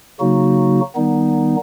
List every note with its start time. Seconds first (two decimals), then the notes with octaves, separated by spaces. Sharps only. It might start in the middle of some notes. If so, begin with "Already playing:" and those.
0.20 C#3 F#3 A#3 D#4 F#4
0.95 D#3 G3 B3 D#4